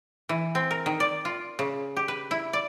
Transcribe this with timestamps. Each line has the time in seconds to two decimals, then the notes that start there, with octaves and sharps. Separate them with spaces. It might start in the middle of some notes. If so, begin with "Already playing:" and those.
0.29 E3
0.55 C4
0.71 A#4
0.86 D#3
1.00 D5
1.25 F4
1.59 C#3
1.97 G4
2.08 B4
2.31 E4
2.53 D5